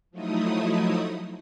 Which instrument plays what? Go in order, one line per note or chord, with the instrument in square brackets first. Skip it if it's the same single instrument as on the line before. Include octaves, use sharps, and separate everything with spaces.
[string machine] F3 F#3 A3 D#4 E4 D#6